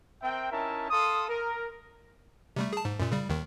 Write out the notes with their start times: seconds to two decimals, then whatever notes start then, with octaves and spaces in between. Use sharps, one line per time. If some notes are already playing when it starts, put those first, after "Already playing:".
0.22 C4 A#4 E5 G5
0.52 C#4 D#4 E4 A#4 E5 A5
0.91 A4 F5 C6 D#6
1.29 A#4
2.56 C3 G3 A3
2.73 G#4 A5
2.85 G#2
3.00 F#2 A#2
3.12 C#3 G3
3.29 D#2 D#3